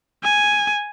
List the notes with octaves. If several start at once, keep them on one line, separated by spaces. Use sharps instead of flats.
G#5